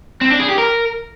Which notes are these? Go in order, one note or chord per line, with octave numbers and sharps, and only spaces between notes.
C4
D4
G#4
G4
A#4